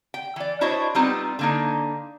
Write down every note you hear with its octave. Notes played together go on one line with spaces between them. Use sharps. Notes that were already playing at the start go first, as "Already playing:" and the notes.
G5
E3 D5
D4 E4 F#4 C5 C#5 D#5
G3 B3 C4 D#4 F4
D3 A#3 D#4